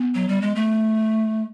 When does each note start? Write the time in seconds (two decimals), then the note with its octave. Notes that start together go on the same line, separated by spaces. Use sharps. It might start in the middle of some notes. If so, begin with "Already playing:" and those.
Already playing: B3
0.15 F#3
0.28 G3
0.42 G#3
0.56 A3